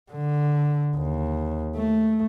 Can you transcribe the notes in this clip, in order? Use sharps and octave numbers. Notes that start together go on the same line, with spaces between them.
D3
D#2
A3